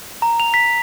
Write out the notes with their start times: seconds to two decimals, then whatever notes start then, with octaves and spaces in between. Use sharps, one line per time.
0.22 A#5
0.40 F7
0.54 B6